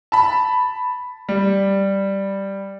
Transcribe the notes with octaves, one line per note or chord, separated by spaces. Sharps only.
A5 B5
G3